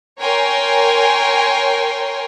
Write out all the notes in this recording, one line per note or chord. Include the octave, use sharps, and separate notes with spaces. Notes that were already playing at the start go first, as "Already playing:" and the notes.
A#4 C#5 G5 G#5 C6